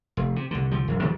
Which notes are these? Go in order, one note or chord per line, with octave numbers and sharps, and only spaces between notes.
F1
C3
C2 D3
C2 D3 F3
E1 F#2
E2 D#3 F3 G3